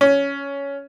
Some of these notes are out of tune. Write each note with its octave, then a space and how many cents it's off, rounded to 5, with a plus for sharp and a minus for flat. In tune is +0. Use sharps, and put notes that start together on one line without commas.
C#4 +10